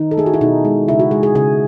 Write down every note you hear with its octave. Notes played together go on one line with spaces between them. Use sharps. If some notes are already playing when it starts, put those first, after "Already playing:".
Already playing: D#3 D#4
A4
A3 G#4
F#4
E4
B2 D#4
G#3
C#3 E4
F#4
G#3 G#4
G#4
C#3 G#4